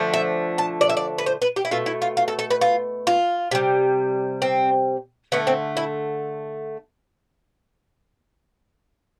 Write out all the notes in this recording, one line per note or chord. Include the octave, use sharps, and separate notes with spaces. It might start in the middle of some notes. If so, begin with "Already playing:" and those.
Already playing: D3 F3 A3
E5
A5
D5
E5
D5
B4
C5
B4
G4
E4
B2 A3 F4
E4
F4
F4
A4
A4
B4
F4
F4
C3 G3
C4
D3 A3 B3
C4
E4